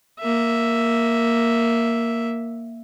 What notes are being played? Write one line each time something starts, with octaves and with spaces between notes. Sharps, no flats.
A#3 E5